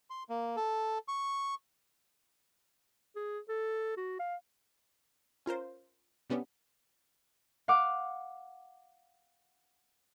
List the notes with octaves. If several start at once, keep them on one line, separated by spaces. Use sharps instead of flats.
C6
A#3
A4
C#6
G#4
A4
F#4
F5
C#4 F4 A#4 C5
C3 G3 B3 C#4 D4
F5 F#5 D6